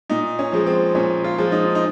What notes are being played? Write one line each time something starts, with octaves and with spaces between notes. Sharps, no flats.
A#2 D#4
C#4
F3 G#3
C4
A#2 C#4
F4
F3 G#3
D#4
D#4